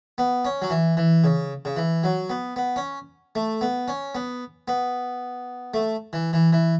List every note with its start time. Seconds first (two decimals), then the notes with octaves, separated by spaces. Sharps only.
0.18 B3
0.45 C#4
0.62 F#3
0.70 E3
0.97 E3
1.24 C#3
1.65 C#3
1.77 E3
2.04 F#3
2.30 B3
2.56 B3
2.76 C#4
3.35 A3
3.61 B3
3.88 C#4
4.15 B3
4.68 B3
5.74 A3
6.13 E3
6.33 E3
6.53 E3